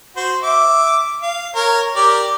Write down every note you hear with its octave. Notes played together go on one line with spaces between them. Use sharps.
F#4 C5
E5 D6
F5
A#4 C#5
G4 A#4 D5